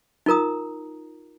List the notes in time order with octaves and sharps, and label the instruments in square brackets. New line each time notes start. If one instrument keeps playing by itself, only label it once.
[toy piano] D#4 F4 A#4 A#5 D#6